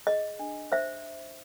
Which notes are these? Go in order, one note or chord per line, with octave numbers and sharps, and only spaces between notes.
G#4 D#5
D4
C5 E5